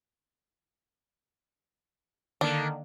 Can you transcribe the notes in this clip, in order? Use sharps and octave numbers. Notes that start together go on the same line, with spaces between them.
D3 D#3 A#3 D4